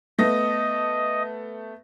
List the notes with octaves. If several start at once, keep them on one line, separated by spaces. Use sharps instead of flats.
A3 B3 D#5 A#6